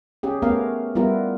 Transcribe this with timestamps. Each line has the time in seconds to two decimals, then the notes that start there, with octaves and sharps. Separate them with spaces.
0.23 C#4 G4 G#4
0.42 A3 B3 C#4 G4 A#4 F5
0.95 G3 B3 E4 F4 A#4